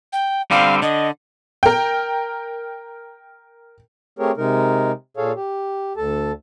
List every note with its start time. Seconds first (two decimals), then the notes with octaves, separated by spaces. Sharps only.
0.13 G5
0.51 D3 G3 C4 F5
0.82 D3 D#5
1.63 A#4 G5
4.19 A3 C4 G4 G#4 A#4 C#5
4.37 C3 G#3 D#4 A#4
5.17 A#2 G#4 A4 C#5 F5
5.36 G4
5.97 D2 A4 A5